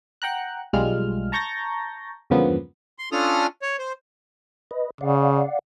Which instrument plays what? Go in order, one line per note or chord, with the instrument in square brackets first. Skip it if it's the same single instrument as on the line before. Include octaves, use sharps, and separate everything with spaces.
[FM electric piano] F#5 G5 A#5 F#6
B1 G3 G#3 F4 F6
A5 A#5 C#6 G6 A6 A#6
E2 G2 C#3 F3 A#3 B3
[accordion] C6
C#4 D4 F4 A4 D#6 F6
C#5
C5
[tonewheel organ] B4 D#5
[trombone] C#3 [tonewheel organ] D5 F5 F#5